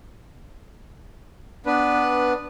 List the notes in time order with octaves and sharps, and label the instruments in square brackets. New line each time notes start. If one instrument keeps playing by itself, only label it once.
[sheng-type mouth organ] B3 D4 B4